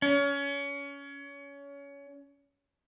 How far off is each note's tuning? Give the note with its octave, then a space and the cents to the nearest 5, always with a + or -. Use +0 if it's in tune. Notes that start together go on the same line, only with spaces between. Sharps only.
C#4 +25